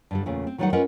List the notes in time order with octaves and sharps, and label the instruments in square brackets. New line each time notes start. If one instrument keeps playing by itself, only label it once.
[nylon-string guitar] G2 D3 G3
E2 A#2 C#3 A3
C4
D#3 F#3 G3 D#4 B4 F#5
C#4 F4 A#4 B4 D#5 F#5